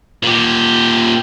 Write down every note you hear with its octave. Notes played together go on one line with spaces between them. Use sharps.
A#2 G4